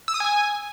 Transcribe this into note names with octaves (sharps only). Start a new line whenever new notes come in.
E6
D#6
G#5